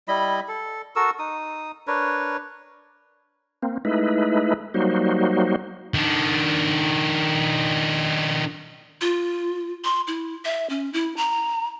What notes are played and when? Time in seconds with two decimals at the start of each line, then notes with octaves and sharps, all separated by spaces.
0.08 G3 E4 D#5 B5
0.48 A4
0.96 F#4 A4 A#4 E6
1.19 D#4 D#6
1.87 D4 A#4 B4 C#5
3.63 A#3 C4
3.85 G#3 A3 D#4 E4 B4
4.74 F#3 G3 A#3 D#4 F#4 C5
5.94 D#3 D4
9.01 F4
9.84 C6
10.07 E4
10.45 E5
10.70 C#4
10.93 E4
11.17 A#5